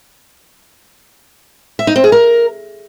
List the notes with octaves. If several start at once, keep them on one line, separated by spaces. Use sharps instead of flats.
E5
D#4
C4
G#4
A#4